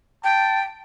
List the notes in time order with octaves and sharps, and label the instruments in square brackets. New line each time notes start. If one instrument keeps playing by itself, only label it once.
[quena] G5 [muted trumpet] A5